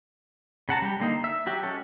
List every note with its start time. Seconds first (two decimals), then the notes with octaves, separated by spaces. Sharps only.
0.69 C#3 F#5 A5 A#5
0.82 G3 G4
1.00 D3 A#3 D#4
1.24 E5
1.46 F#3 F#4 G4
1.63 G#3 C#4 A4